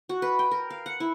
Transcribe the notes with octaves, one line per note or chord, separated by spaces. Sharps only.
F#4
B4
G5
A#4
F5
F#5
E4